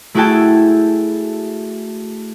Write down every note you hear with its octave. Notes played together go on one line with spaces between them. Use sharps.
A3 E4 F#4 G#4 G5 A5